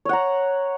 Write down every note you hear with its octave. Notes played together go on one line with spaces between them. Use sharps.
C#5 F#5 A#5